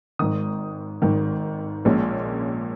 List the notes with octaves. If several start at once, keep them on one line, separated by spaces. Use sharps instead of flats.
G#1 G#2 D#3 D#6
G#1 G#2 D#3
A#1 A#2 G#3 C#4